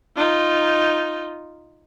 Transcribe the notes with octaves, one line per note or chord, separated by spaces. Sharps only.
D#4 F4